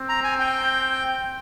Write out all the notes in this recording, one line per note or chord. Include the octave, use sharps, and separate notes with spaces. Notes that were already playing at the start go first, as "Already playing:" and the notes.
Already playing: C4
A#5
G#5
G5